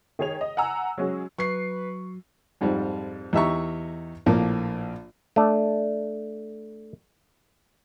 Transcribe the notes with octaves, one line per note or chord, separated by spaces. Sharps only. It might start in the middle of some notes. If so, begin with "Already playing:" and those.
D#3 G#4 C#5 F7
D#5
F#5 G#5 A#5 E6
F#3 G#3 C#4 F#4 G#4
F#3 B4 C#6 C7
F2 G#2 F3 G3
E2 D#4 G4 E5 A#5 C#6
A#1 A2 F3 A#3
A3 D4